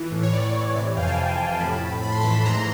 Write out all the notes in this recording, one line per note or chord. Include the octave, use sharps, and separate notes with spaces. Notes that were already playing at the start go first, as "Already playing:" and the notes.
Already playing: E3
A2
C#5
A2 D5
E3
C3 D5
F2 F5 G5
G#5
G5 A5
C3
F2
A2 A5 B5
A2
A2 B5
C6
A5 B5
E3
G#2 A#5 C6